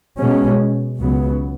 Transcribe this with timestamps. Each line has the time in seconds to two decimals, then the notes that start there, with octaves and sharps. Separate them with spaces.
0.19 B2 G#3 C#4
0.99 C#2 C#3 F#3 B3